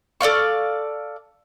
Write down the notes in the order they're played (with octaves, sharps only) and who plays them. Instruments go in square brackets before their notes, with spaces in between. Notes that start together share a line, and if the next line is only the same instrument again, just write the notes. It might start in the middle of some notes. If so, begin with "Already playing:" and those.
[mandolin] A4 D5 F5 C#6